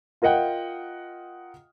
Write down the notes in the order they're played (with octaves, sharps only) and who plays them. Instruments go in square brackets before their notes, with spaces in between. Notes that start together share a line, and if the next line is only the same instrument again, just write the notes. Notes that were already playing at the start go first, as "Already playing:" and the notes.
[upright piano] F4 A#4 D#5 F#5 G5